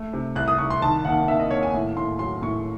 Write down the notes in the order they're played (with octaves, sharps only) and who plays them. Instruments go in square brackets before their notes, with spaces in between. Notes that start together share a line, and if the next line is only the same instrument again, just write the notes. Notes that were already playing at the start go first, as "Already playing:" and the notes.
Already playing: [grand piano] A3
C3
C2 F#6
D#6
C2 C#6
C6
D#3 A5
D#2 F#5
D#2 E5
D#5
D#2 C#5
G#5
A2
A2 C6
F#3 C6
A2 C#6